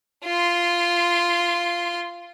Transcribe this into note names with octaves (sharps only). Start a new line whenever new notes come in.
F4 C6